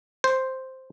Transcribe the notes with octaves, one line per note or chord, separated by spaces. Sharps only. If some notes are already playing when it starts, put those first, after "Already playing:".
C5